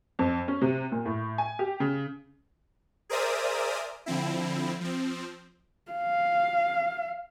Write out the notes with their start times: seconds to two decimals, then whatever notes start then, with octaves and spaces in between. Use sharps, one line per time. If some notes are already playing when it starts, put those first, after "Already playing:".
0.19 F2
0.48 C#4
0.62 C3
0.92 A#2
1.05 A2
1.38 G#5
1.59 G4
1.80 C#3
3.09 G#4 A#4 C5 D5 E5 D#6
4.06 D3 F3 C4 E4
4.81 F3 C4
5.92 F5